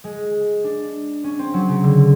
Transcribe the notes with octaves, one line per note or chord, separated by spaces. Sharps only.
G#3
D4
C#4
C4
F#3
C#3
D3